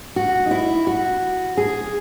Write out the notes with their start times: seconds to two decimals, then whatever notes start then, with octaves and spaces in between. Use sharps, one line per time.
0.16 F#4
0.46 D#4
0.51 E4
0.87 F#4
1.57 G#4